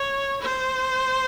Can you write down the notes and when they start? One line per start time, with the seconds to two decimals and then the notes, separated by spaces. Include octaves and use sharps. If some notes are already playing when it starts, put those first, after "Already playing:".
Already playing: C#5
0.41 C5